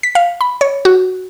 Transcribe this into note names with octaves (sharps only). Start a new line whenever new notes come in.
B6
F5
B5
C#5
F#4